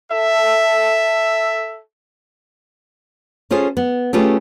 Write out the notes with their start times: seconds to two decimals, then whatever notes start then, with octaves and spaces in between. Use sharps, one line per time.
0.11 A4 E5
3.51 C#4 F4 G#4 A4 C5
3.77 B3
4.13 A3 C#4 F4 G4 G#4 B4